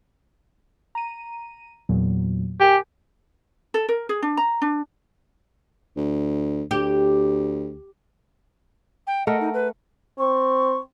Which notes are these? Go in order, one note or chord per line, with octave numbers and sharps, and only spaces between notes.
A#5 D#7
E2 A#2 F#3
G4 A#4 G#5
A4
A#4
G#4
D4
A#5
D4
D2
D2 G4
G5
A3 A#4 D#5 F#5
D#4
B4
C4 C#6